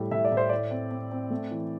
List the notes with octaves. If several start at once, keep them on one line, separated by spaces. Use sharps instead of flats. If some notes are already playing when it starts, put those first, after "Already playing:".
Already playing: A2 G3 A3
A2 E5
D5
A2
C5
E4 D5
C4
C4
C4
A3
E3